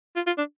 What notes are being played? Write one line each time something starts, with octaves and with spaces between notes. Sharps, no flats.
F4
F4
D4